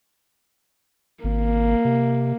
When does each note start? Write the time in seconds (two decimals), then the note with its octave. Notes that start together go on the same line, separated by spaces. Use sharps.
1.24 G#1 A#3
1.85 C3